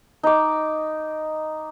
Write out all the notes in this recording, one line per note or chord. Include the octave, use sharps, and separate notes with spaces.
D#4 D6